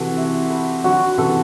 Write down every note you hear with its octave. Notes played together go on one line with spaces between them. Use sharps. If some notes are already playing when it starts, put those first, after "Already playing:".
Already playing: C3 E3 F#4 A4
E4
B4
D3 F#3 F#4
C3 E3 A4